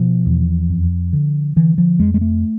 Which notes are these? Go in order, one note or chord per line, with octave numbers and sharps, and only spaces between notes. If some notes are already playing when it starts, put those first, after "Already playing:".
Already playing: B2 F3
E2
F2
D3
D3 E3
F3
F2 G#3
G#3
A3